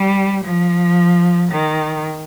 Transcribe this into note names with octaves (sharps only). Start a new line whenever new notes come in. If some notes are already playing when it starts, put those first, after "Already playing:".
Already playing: G3
F3
D#3